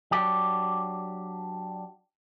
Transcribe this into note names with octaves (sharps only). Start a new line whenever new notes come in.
F#3 D4 G4